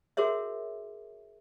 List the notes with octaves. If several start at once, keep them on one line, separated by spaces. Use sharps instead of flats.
F#4 G#4 A#4 C#5 E5